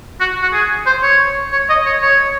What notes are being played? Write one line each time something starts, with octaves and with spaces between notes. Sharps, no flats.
F#4
F#4
G#4
C5
C#5
C#5
D#5
C#5
C#5